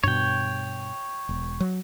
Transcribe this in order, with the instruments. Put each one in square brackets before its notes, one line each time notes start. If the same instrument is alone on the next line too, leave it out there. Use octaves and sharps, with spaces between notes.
[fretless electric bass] G2 B2 [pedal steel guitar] C#5 G5
[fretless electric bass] E1
F#3